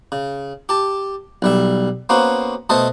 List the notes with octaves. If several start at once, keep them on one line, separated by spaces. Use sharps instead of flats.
C#3
G4 A5
B1 G3 E5
A#3 B3 C#4 F#4 C5
B2 A3 A4 C5 D#5 A5